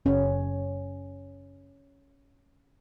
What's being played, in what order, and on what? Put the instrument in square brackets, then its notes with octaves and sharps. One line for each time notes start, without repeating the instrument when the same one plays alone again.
[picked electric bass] F#1 [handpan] C#4